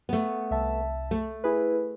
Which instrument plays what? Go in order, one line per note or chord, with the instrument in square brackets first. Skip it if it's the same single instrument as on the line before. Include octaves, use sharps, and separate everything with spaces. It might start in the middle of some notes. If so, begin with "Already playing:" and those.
[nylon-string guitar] A3 B3
[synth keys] C2 E5 A5
[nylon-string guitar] A3
[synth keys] E4 G#4 B4